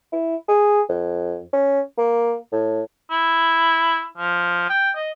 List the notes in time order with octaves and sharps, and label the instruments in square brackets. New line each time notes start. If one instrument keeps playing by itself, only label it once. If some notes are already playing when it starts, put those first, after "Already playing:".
[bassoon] E4
G#4
F2
C#4
A#3
A2
[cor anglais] E4
F3
G5
D#5